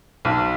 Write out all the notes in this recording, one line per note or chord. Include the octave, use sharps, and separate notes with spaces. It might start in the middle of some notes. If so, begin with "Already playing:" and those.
B1